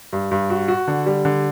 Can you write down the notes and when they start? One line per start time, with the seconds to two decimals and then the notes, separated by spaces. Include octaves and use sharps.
0.13 G2
0.31 G2
0.50 F#4
0.68 F#4
0.88 D3
1.06 G3
1.25 D3